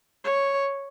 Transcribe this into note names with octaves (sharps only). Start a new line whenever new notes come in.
C#5